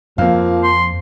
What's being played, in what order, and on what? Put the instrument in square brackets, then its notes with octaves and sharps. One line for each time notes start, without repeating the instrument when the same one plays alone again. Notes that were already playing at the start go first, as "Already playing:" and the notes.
[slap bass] F2 [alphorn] F3 [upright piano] A#3 F5
[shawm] C6